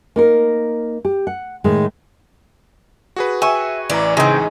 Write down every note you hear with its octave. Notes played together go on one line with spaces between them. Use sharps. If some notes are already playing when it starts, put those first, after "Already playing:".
A#3 D#4 A#4
G4
F#5
A2 D#3 G#3
F#4 G#4 B4
E5 G#5 C#6
A1 E3 D5 A#5
C#3 G#3 C4 D#4